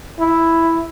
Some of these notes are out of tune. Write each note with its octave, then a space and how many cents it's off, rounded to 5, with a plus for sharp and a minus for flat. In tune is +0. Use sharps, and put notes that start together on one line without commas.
E4 +0